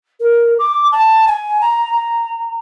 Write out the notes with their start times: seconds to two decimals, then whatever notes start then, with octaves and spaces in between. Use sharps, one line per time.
0.20 A#4
0.59 D6
0.92 A5
1.27 G#5
1.61 A#5
1.92 A#5